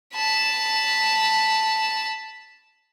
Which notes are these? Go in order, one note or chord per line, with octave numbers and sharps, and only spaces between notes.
A5 B5